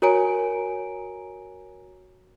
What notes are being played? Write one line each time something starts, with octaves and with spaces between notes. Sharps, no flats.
F#4 A#4 C#5 G#5 A#5 D7